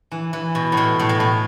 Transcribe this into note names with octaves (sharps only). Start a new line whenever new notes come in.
E3
E3
B2
A2
B2
A2
B2
A2